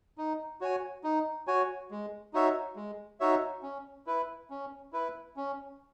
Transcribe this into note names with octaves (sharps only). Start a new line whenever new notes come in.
D#4
F#4 C#5 G#5
D#4
F#4 C#5 G#5
G#3
D#4 F#4 C#5 E5
G#3
D#4 F#4 C#5 E5
C#4
E4 B4
C#4
E4 B4
C#4